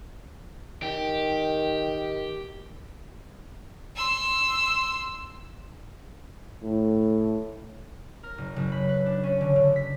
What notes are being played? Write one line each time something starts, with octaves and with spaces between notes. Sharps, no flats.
D#3 G4
C6 E6
A2
A#4
F#1
F#1
B5
B4
D4
C#4
D3
D3
B6